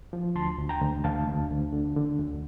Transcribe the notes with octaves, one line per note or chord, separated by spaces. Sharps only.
F3
D2 A5 C6
D2
G5 A#5
D2
D2 F5 A5
D2
D2
D3
D3
D2